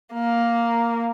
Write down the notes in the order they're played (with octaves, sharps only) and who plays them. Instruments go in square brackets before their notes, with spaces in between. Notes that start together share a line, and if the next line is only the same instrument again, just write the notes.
[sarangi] A#3